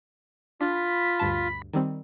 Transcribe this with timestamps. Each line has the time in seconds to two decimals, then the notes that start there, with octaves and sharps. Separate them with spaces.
0.61 D4 F4 B5
1.19 D2 G2 A5
1.73 D#3 G3 C4